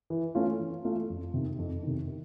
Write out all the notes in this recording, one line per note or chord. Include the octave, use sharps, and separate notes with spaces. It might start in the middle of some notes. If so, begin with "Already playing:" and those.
E3
A3 C#4 F4
E3
A3 C#4 F4
F2
C3 D#3
F2
C3 D#3
D#3